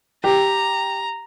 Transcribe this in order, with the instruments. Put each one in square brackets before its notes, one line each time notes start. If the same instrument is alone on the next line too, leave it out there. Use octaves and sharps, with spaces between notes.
[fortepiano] G4 [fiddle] A#5